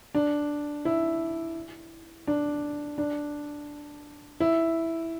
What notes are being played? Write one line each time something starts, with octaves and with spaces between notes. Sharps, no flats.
D4
E4
D4
D4
E4